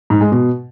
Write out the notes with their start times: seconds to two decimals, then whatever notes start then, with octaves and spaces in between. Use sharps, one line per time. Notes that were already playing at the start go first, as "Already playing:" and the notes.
0.10 G#2
0.21 G#3
0.32 B2